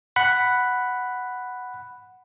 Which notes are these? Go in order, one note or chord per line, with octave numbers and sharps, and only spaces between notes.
F#5 B5